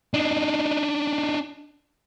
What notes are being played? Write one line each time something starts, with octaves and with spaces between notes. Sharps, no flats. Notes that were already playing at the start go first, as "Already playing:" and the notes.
D4 D#4